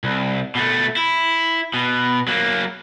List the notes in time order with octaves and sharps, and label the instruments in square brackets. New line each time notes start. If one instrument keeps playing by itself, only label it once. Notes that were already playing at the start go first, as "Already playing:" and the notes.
[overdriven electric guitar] C2
B2 A3
E4
B2
F#3 A#3